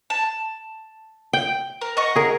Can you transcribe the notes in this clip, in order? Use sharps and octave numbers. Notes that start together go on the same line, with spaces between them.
A5
G5
A#4
D#5 F#5 C#6
G#4 A#4